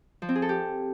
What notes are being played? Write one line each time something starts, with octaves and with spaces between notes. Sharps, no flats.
F3
C4
G#4
A4
G4